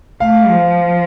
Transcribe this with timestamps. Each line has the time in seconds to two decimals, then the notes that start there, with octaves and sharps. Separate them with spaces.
0.20 A3 F5
0.48 F3